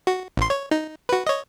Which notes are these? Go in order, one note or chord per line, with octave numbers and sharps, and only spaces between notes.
F#4
A1 C6
C#5
D#4
F#4 B4
C#5 D#5